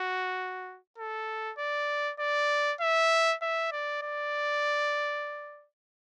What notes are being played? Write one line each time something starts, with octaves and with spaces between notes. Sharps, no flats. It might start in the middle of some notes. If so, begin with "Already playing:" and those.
Already playing: F#4
A4
D5
D5
E5
E5
D5
D5